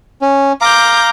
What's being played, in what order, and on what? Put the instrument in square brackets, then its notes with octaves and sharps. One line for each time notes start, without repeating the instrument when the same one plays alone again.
[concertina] C#4
[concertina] F5 A#5 [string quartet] D6 G6